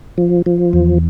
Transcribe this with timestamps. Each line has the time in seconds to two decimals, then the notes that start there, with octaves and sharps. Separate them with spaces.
0.18 F3
0.46 F3
0.73 E2